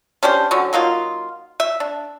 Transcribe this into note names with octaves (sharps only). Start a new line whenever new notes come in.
C#4 D4 G4 C5
D3 F#3 C#4
F#3 A#3 D#4 F4
E5
D4